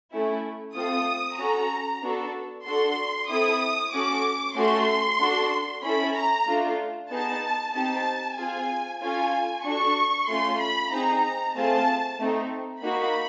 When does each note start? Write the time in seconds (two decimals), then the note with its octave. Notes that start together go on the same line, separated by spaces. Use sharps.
0.11 A3 C#4 E4
0.76 A3 C4 F4 A4 D#6
1.38 C#4 F#4 A4 A#5
2.03 B3 D4 F#4 A4
2.66 D4 F#4 A4 C6
3.29 C4 E4 A4 D#6
3.93 C#4 F#4 A4 D6
4.56 A3 C#4 F#4 A4 C6
5.20 D4 F#4 A4
5.83 C#4 E4 A4 B5
6.15 A#5
6.48 A3 D4 F4
7.11 B3 D#4 G#4 A5
7.74 C4 D#4 G4 A5
8.37 C4 F4 G#4 G#5
9.01 C#4 F4 A4 G#5
9.64 D4 F#4 A4 C#6
10.28 A3 C#4 F4 C6
10.60 B5
10.92 C4 D#4 G#4 A#5
11.56 A3 C4 F4 G#4 A5
12.19 A3 C4 D#4
12.82 A#3 D#4 F#4 B5